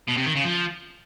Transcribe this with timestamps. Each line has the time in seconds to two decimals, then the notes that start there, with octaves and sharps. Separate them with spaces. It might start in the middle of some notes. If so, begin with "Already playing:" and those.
0.09 B2
0.18 C3
0.27 D#3
0.36 C#3
0.45 F3